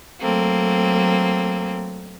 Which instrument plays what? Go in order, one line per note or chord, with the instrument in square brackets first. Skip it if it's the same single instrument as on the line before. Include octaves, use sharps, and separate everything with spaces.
[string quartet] F#3 A3 A#3 C4